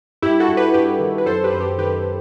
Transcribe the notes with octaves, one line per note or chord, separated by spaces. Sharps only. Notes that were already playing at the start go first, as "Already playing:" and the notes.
G2 E4 G4
F#4 A4
G2
G4 B4
G2 G4 B4
D#3
B4
F#2 A4 C5
G4 B4
F#2 C5
G4 B4
D#3 G4 B4